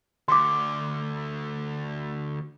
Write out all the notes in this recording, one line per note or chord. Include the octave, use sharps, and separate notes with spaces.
D2 C6 D6